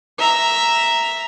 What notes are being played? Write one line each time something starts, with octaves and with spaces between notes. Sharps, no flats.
E5 A#5